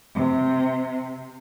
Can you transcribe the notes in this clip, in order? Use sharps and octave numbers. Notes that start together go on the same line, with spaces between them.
C3